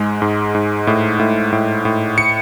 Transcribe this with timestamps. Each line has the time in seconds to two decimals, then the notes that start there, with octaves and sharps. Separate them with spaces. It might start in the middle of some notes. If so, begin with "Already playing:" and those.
Already playing: G#2 G#3
0.22 G#2
0.55 G#2
0.87 A2
1.20 A2
1.53 A2
1.85 A2
2.18 C#7